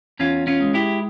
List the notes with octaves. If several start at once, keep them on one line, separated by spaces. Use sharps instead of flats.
E2 C#4 F4
C#4 F4
G#3
E4 G4